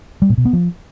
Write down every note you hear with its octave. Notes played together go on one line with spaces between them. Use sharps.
G3
A#2
B2
B3
F3